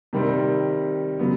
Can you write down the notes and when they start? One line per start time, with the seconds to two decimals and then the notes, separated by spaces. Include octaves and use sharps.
0.13 C3 D#3 G3 C4
1.19 C#3 F#3 B3